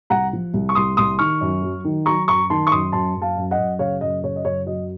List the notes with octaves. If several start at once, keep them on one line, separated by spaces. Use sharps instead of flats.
C2 F#5 A#5
F3
C2
C#6
C2 C6 D#6
C2 C6 D#6
D#3 C#6 F6
F#2
F#3
D#3
F#3 A#5 C#6
F#2 A#5 C#6
D#3 A5 C6
C#6
F#2 C6 D#6
F#2 A5 C6
F#2
F5 A5
F#2
D#5 F#5
F#2
C#3 C#5 F5
F#2 D#5
C#3 C#5
D#5
F#2 C#5
F#3 D#5